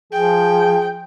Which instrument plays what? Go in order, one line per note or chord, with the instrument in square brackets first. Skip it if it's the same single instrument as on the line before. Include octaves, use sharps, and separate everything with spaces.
[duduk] F3 [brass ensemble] G#4 [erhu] G5